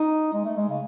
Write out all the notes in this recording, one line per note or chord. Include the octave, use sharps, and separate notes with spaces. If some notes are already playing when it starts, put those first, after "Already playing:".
Already playing: D#4
G#3
A3
G#3
C#3